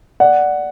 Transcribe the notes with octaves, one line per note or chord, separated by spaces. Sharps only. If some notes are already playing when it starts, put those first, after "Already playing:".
D5 F#5